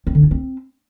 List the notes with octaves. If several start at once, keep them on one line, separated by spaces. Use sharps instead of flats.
C4
D3
F4
C4